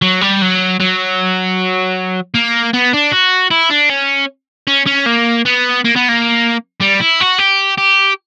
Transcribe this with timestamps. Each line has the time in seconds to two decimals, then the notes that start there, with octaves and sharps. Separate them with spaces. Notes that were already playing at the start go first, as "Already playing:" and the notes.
0.02 F#3
0.21 G3
0.42 F#3
0.80 F#3
2.34 A#3
2.74 B3
2.94 D4
3.12 F#4
3.51 E4
3.70 D4
3.90 C#4
4.68 C#4
4.86 C#4
5.06 A#3
5.45 B3
5.84 A#3
5.96 B3
6.09 A#3
6.80 G3
7.01 E4
7.20 F#4
7.38 G4
7.78 G4